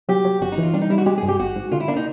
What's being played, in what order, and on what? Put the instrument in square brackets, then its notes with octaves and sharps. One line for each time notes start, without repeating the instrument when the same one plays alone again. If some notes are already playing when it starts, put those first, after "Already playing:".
[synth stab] F#3 [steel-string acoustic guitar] G4
[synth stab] F#3
[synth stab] G1 [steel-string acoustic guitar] F#4
[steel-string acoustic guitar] D#4
[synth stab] E3
[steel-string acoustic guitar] F4
[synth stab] G3 [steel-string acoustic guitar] D4
[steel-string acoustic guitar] D#4
[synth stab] G3 [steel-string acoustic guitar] E4
[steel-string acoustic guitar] F#4
[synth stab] G#3 [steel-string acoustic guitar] G4
[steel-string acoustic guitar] G#4
[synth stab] G2
[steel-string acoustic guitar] G4
[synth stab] G#1 [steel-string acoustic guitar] F#4
[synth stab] G#2
[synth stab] D3 [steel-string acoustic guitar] F4
[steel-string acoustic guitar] E4
[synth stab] A#3 [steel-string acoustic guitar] D4
[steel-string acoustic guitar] D#4